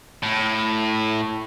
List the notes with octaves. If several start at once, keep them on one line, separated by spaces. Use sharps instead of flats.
A2